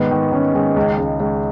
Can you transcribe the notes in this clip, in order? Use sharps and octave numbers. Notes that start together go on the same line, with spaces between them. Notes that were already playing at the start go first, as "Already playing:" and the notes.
Already playing: G#2 D#3 B3
D#3
D#3 C#4
D#3 G#3
C#2
C#2
C#2